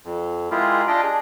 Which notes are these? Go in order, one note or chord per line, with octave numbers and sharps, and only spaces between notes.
F2
G#3 E4 F4 G4 G#4 A#4
D4 F4 G4 D#5 F5 G5
D4 G#4